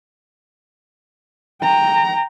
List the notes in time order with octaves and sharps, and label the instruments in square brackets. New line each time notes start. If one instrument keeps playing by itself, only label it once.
[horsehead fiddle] G5 A#5